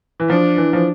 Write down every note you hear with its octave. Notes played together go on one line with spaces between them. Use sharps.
E3
F3 D4
E3
F3